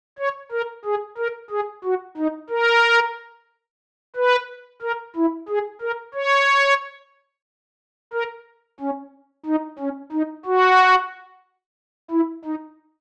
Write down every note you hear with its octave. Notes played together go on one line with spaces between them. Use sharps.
C#5
A#4
G#4
A#4
G#4
F#4
D#4
A#4
B4
A#4
E4
G#4
A#4
C#5
A#4
C#4
D#4
C#4
D#4
F#4
E4
D#4